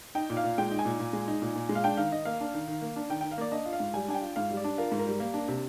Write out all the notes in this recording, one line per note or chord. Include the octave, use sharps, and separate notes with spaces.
D#4 G5
A#2
F5
A#2
G#3 G5
D#4
G#5
A#2
A#2
G#3
D#4
A#2
A#2
G#3
F5
D4 G5
D#3 F5
D#3 D#5
A#3 F5
D4
D#3
D#3
A#3
D4
D#3 G5
D#3 G5
F5
A#3 D5
D4 D#5
F4
F5
G#2
G3 G#5
D4 G#5
G5
F4
G#2 F5
G3
D5
D4
F4 A#4
G#2
A#4
G3
A#3
D4
C3